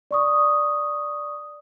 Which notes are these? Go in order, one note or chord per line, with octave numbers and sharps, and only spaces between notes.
D5 C#6 D#6